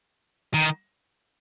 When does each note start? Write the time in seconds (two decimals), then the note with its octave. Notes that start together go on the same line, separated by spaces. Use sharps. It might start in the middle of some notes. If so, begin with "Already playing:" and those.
0.54 D#3